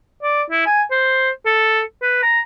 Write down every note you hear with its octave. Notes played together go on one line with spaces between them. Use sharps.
D5
E4
G#5
C5
A4
B4
A#5